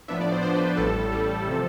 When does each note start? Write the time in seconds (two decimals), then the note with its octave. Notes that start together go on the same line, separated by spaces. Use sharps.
0.08 A2 F3 B3 D4 E5
0.21 D5
0.32 C5
0.43 A2 F3 B3 D4 C5
0.55 B4
0.77 A1 A2 G3 A4
1.12 A1 A2 G3
1.48 C3 F3